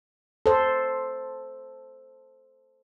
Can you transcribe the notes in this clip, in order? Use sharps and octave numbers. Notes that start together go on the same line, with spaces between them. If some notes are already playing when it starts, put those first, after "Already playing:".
A4 C5